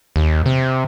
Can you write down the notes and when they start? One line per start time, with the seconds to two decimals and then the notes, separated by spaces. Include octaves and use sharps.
0.16 D#2
0.46 C3